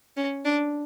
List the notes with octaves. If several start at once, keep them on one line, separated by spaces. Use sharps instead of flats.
C#4
D4